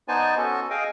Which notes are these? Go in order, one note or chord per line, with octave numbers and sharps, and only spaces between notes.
B3 D#4 C5 D5 G#5 A5
B3 C#4 F#4 A4 A5
G#4 D#5 F5 G5 G#5